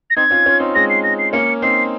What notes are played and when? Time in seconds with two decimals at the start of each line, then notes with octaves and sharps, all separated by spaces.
0.10 A#6
0.17 C4 D#4 G#6
0.31 C#4 F4
0.46 C#4 F4
0.60 C4 D#4
0.75 G#3 C4 A#6
0.90 C7
1.04 A#6
1.19 C7
1.33 A#3 C#4 C#7
1.62 C4 D#4 C7